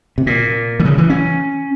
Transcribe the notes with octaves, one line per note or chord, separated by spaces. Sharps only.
C3
A#2
E3
C#3
E3
C#4